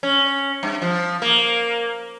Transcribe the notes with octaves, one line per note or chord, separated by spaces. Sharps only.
C#4
G2
F3
A#3